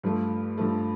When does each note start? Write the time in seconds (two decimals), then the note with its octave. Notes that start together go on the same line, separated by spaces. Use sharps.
0.03 G2 F3 A3
0.58 G2 F3 A3